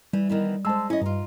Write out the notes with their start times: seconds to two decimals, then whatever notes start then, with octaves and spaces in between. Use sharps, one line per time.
0.13 E3 G3
0.29 D#3 E3 B3
0.65 G#3 C5 A5 E6
0.90 C#4 E4 D#5
1.02 G2 D#4 F4